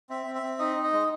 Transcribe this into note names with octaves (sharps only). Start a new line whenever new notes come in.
C4 E5
C4
E5
C4
D#4 D#5
D#4
D#5
G#3